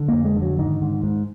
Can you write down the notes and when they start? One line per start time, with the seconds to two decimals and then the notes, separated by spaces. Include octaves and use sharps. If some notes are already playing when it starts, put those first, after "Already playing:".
Already playing: D3
0.08 F2 A#3
0.25 G#3
0.37 D3
0.42 F#3
0.59 G#2 D#3
0.81 G#2
1.03 G#2